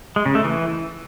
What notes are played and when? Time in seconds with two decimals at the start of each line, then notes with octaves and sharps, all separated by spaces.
0.16 G#3
0.26 C#3
0.35 A3
0.44 E3